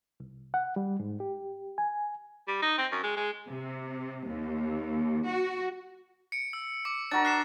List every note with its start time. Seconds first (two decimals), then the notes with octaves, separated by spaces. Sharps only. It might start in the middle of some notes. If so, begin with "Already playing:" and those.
0.20 C2
0.54 F#5
0.76 G3
1.00 G#2
1.20 G4
1.78 G#5
2.48 G3
2.62 D#4
2.78 C4
2.92 F#2
3.04 G#3
3.17 G#3
3.50 C3
4.28 D#2
5.27 F#4
6.32 C#7 D7
6.53 E6
6.85 D6 C#7
7.11 D4 F#4 A#4 A6
7.25 F#6 C7 E7